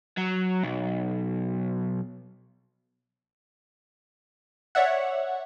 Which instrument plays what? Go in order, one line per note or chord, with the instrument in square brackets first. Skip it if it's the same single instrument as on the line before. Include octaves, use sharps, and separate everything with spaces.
[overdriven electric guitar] F#3
B1
[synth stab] C#5 D5 E5 F#5